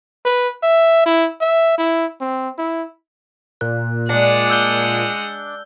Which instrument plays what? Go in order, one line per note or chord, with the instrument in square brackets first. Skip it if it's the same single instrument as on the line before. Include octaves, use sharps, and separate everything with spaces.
[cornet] B4
E5
E4
E5
E4
C4
E4
[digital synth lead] A#2 [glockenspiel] F#6
[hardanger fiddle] G#3 F#5 [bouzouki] D4
[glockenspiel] E6 G6 G7